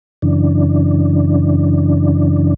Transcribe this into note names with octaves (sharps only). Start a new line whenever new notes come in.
F#2 C#3 E3 D4